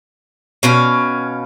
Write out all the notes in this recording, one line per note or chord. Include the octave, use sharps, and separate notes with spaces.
B2 C#4 F5